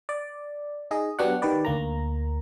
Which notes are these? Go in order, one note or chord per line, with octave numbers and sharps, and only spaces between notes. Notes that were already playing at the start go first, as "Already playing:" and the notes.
D5
D#4 G#4 D#5
F#3 B3 D4 G4 C#5 F#5
D#3 G4 B4 D5
D2 A#3 A#5